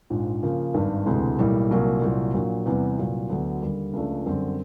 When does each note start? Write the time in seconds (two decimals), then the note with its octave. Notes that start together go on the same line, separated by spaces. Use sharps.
0.10 A#1 G#2 F3
0.43 C#3 F3 A#3
0.74 G#1 G2 D#3
1.06 E1 D2 C3 E3 G#3
1.39 B1 A2 E3 G3 A#3
1.71 C2 A#2 F#3 A#3
2.02 C2 A#2 F#3
2.34 A#1 A#2 F#3 A#3
2.66 E2 C3 E3 G3 B3
2.98 C2 A#2 F#3
3.30 D2 D3 F#3 B3
3.62 D#2 D3 G3
3.93 C#2 C#3 F3 A3 D4
4.26 F#2 D3 G3 C4